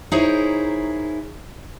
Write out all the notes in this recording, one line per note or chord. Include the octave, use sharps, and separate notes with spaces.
D#4 E4 G#4 A#4 C5 C#5